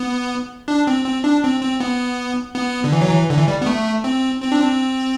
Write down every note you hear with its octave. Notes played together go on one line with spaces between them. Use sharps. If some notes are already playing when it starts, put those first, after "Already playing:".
Already playing: B3
D4
C4
C4
D4
C4
C4
B3
B3
D3
E3
F#3
E3
D3
E3
G3
B3
A3
C4
C4
D4
C4